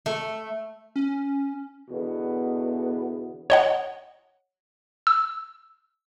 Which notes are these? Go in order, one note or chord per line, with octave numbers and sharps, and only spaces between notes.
A3
C#4
E2 B2 D3 B3
C#5 D#5 F#5
E6